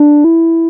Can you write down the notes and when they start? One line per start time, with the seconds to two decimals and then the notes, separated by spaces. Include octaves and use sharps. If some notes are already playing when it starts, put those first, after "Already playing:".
Already playing: D4
0.24 E4